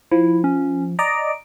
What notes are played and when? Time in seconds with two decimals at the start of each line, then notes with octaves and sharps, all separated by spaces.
0.11 F3 E4
0.44 C#4
0.99 D5 D#5 A#5 D7